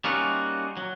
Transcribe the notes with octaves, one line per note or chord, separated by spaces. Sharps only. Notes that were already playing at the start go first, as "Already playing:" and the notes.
G3 A#3 C#4 D#4 F4 F#4
F#3